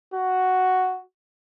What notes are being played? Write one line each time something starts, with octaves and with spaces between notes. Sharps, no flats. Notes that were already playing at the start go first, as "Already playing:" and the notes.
F#4